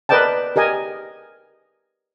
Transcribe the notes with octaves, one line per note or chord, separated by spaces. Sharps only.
A#4 B4 D5 D#5 G5 A5
G4 A#4 D#5 G#5